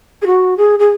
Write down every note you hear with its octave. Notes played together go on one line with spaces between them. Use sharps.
G#4
F#4
G#4
G#4